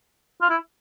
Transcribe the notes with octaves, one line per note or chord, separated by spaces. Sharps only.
F4
E4